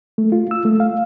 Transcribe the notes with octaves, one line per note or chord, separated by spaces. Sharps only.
A3
F4
E6
A3
F5